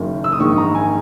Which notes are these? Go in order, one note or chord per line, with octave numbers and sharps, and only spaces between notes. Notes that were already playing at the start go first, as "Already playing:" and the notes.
Already playing: F#1 F#2 D#3
E6
D#6
A#1 G#2 D#3 C#6
A#5
G#5